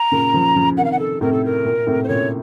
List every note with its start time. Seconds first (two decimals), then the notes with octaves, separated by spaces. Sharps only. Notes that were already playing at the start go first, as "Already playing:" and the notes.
Already playing: A#5
0.12 A#2 C#3
0.34 C#3 F3
0.56 C#3 F3
0.77 C3 D#3 F#5
0.84 F5
0.92 F#5
0.99 A4
1.21 A2 C3 A#4
1.33 A4
1.45 A#4
1.65 A#2
1.87 A2 C3
2.04 C5
2.08 A#2 C#3 C#5